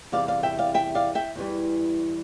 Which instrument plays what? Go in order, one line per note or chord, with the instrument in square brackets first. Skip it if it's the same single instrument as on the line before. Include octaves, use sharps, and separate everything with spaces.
[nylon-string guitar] E2 C3 E3 G3 D5 F5
D5 F5
E5 G5
D5 F5
E5 G5
D5 F5
E5 G5
E2 E3 G3